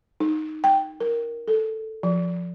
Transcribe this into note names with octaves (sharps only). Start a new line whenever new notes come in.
D#4
G5
A#4
A4
F3